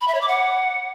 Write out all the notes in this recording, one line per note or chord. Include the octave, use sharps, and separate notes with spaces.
B5
E5
C#5
D6
F#5